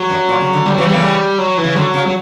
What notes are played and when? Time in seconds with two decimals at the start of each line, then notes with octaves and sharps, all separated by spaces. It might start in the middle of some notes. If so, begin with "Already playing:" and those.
Already playing: F#3
0.10 F#2
0.29 A#2
0.41 C#3
0.53 D3
0.66 D3 G3
0.74 C#3 E3 F#3
0.84 G3
0.89 C#3 E3 A#3
1.02 G3
1.38 F#3
1.58 E3
1.64 C#3
1.76 D3 F#3
1.94 C#3
2.07 F#3